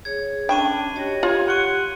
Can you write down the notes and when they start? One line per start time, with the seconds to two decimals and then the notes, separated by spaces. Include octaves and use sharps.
0.05 G#4 C#5 G#6
0.49 C#4 D4 G5 B5 C#6 D#7
0.95 F#4 G4 C#5 D#5
1.23 F4 G4 C#5
1.48 F#5 C6 C#6 D#7